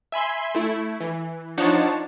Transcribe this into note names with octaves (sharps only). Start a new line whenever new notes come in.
E5 G#5 B5 C6
A3 E4
E3
F3 D4 D#4 C#5 F#5 A5